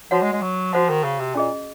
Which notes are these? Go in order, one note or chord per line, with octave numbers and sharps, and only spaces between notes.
F3 F#4 C#5 F#5
G#3
G#3
F#3
F3 F#4 C5 F#5
D#3
C#3
C3
A#2 C#4 G#4 D#5